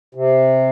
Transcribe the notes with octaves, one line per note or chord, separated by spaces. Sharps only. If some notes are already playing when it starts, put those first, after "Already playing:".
C3